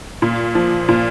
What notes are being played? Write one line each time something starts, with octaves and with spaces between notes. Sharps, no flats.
A#2
F3
A#2